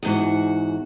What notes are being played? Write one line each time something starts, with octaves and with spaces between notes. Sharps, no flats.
E2 G#2 F#4